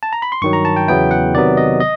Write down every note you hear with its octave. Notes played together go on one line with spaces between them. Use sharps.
A5
A#5
B5
C6
G2 D#3 F#3 C#6
A#5
A5
G5
E2 C#3 F#3 B3 E4 G5
F#5
C3 D#3 F#3 B3 D5
D#5
D#5